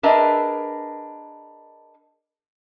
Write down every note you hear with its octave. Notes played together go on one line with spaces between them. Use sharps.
D4 G#4 A#4 B4 D#5 E5